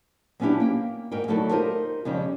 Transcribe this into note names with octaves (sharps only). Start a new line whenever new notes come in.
F#3 B3 C#4 D4 E4 G4
A#3 G5
G#2 A#4 D#5 G5
D3 F#3 A3 D#4 E4 A4
D#4 F4 G4 A#4 C5 D#5
F2 C#3 G3 G#3 C#4